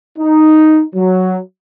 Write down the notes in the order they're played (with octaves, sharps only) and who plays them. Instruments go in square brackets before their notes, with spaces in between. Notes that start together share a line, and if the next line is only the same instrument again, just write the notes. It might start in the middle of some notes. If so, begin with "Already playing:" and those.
[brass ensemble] D#4
F#3